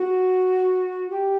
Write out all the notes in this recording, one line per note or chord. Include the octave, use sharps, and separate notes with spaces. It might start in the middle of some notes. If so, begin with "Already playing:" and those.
Already playing: F#4
G4